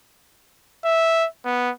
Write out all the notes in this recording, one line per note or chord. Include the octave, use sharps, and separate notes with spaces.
E5
B3